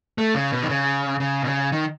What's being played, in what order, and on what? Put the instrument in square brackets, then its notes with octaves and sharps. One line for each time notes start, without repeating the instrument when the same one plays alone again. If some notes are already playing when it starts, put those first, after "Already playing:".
[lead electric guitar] A3
C#3
B2
D#3
C#3
C#3
B2
C#3
D#3